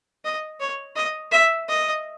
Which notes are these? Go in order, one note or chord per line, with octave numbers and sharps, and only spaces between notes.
D#5
C#5
D#5
E5
D#5